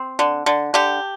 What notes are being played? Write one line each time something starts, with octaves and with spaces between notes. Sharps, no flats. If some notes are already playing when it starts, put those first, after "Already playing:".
Already playing: C4
D3
D3
D3 G4